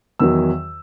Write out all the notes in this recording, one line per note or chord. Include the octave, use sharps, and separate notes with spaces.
E2 D#3 F#3 E6